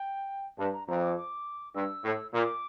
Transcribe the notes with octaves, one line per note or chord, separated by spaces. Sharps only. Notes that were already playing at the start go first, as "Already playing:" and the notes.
Already playing: G5
G2 A5
A#5
F2 A#5
D6
D6
G2 E6
A2
A#2 D6